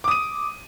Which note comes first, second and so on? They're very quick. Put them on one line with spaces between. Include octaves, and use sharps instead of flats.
D6 D#6 D#7